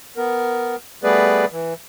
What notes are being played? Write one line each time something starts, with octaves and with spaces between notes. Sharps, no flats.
B3 A#4
G3 A3 B3 G#4 B4 D5
E3